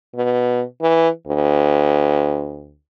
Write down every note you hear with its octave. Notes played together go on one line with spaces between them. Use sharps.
B2
E3
D2